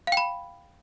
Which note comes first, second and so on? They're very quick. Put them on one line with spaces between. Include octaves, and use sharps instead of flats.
F5 G5 B5